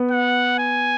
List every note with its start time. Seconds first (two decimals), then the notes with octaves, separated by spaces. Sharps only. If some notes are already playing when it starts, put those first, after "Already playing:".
Already playing: B3
0.11 F#5
0.59 G#5